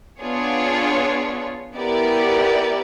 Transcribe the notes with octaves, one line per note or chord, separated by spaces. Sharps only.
B3 D4 F4 G#4 C#5
B3 E4 G4 A#4 D5